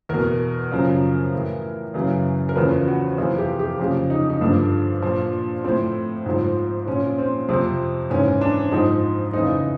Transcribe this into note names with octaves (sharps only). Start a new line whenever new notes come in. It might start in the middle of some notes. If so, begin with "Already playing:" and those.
E2 B2 A#4
F#2 C#3 F3
A2 E3
F#2 C#3 E3
A#4
E2 C#3 F3 B4
F#4
F2 C3 E3 F4
G4
G4
F2 C#3 F3 G4
D#4
D#4
G2 D3 F3 D4
A#2 F3
A2 F3 C4
G#2 F3
A#2 F3 C#4
C4
F2 C3 F3 C4
G#2 E3 C#4
D4
G#2 F3 D#4
F2 C#3 E3 D#4